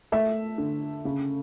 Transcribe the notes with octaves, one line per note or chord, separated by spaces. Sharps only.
A3 E5
D3
C#3